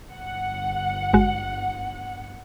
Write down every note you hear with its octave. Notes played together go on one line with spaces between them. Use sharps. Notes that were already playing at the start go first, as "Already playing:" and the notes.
G1 F#5
G#1 G#3 F#4